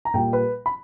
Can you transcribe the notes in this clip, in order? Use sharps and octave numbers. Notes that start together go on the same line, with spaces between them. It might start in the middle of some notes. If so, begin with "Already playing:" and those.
A#5
A#2 G3 G5
B4
B5